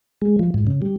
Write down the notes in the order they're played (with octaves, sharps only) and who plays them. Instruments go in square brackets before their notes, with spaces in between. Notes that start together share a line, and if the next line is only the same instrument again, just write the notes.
[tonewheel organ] G#3
F3
G#2
C#3
G3